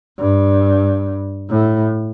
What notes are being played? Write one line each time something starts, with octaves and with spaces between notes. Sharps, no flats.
G2
A2